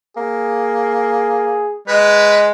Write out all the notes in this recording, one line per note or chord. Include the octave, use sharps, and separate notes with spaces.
A#3 G#4
G#3 B4